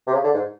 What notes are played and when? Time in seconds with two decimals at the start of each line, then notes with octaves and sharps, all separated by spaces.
0.07 C3
0.13 C#3
0.24 D3
0.34 G#2